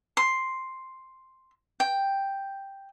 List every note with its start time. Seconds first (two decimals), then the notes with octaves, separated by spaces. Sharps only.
0.17 C6
1.80 G5